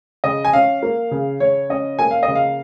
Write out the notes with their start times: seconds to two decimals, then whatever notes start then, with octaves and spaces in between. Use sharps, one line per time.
0.24 C#3 D#5
0.45 G#5
0.53 C#4 F5
0.83 A#3
1.11 C#3
1.40 C#3 C#5
1.70 C#4 D#5
1.99 A#3 G#5
2.11 F5
2.23 C#3 D#5
2.35 F5